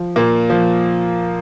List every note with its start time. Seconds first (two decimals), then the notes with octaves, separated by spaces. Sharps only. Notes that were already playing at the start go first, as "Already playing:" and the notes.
Already playing: F3
0.16 A#2 A#3
0.50 F3